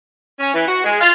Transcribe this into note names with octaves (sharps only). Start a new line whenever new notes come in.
C#4
E3
F#4
G#3
F4